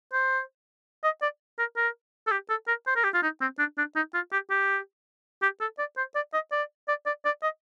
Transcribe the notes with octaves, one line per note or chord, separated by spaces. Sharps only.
C5
D#5
D5
A#4
A#4
A4
G4
A4
A#4
C5
A#4
G4
F4
D#4
C4
D4
D4
D#4
F4
G4
G4
G4
A4
D5
C5
D5
D#5
D5
D5
D5
D5
D#5